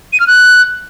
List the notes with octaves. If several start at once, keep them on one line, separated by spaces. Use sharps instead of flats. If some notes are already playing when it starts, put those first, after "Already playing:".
D#7
F6
F#6